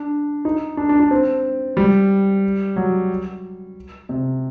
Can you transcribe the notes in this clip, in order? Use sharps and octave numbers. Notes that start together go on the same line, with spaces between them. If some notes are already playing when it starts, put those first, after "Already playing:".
Already playing: D4
D#4
D4
D4
D4
C4
G3
F#3
C3